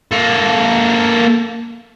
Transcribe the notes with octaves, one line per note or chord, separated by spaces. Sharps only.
A#3 A4